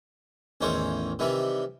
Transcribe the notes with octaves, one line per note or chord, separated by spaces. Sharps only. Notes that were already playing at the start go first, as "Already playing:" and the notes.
A1 E2 D#3 C5 C#5
C3 D#3 E3 G3